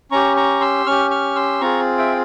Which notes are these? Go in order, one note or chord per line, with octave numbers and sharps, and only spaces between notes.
C#4 G4 A#5 C#6
A#5 C#6
C6 E6
C#4 G4 C#6 F6
C#6 F6
C6 E6
C4 F4 G#4 A#5 C#6
E5 G5